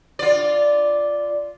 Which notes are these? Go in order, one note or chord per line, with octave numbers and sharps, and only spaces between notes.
F4 D5